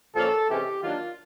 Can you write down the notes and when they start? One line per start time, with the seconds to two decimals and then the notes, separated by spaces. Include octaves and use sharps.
0.14 A#2 F3 A#3 C#4 A4
0.48 C3 E3 G#3 C#4 G4
0.82 D#3 F#3 A#3 D4 F4